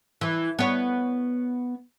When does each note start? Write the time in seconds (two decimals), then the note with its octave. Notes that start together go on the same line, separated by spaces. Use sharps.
0.21 E3
0.59 B3 C#5